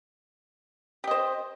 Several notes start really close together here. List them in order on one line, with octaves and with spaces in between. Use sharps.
G4 D#5 C5